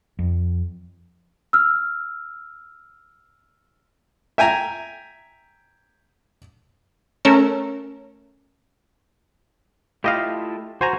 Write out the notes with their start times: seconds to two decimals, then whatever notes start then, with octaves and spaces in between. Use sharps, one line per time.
0.19 F2
1.53 E6 F6
4.38 E5 G5 G#5 A#5
7.25 A3 C#4 A#4 C#5 E6
10.04 A3 E4 F4 G4 D#5 F5
10.81 F#4 C5 G#5 A#5